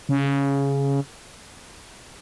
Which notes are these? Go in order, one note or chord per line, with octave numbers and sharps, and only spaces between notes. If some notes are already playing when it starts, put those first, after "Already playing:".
C#3